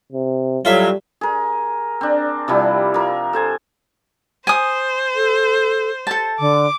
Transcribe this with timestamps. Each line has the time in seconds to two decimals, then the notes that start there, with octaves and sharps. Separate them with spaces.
0.13 C3
0.65 A2 F#3 G3 F4 E5
1.21 G#4 A#4
2.01 C4 D4
2.48 C3 F3 G3 E4
2.94 F3 A#4
3.33 A4 C5 G#5
4.47 C5 G#5 D#6
5.15 A4
6.07 A4 A5
6.39 D3 D6